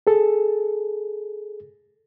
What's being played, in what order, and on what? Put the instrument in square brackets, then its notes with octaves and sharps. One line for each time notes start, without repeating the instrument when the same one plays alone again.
[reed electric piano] G#4 A4